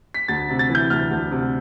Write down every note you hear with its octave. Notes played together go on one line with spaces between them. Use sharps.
B6
D2 A6
C3
A6
E3
G6
D2 F6
D2
C3